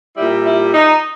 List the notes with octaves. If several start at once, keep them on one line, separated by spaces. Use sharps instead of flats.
A#2 G3 E4
E4
D#4